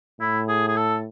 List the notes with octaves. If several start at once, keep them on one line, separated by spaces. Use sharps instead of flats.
A2 E4
G#4
G#4
A4